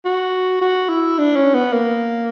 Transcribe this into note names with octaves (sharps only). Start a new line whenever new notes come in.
F#4
F#4
E4
D4
C#4
B3
A#3